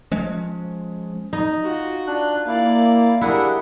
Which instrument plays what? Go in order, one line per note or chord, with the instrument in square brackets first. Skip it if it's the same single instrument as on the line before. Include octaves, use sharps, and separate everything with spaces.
[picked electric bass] F3 G#3 C#4
[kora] D#4
[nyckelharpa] F4 F#4
[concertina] D4 F#6 [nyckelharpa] F4
[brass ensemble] A#3 [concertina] E4 [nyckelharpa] D5 F5
[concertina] D4 E5 F#5 [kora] E4 G#4 [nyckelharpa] G4 A#4